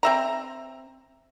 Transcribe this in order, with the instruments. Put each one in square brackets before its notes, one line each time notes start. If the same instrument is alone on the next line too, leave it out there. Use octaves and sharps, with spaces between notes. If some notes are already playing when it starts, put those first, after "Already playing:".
[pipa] C4 E5 A#5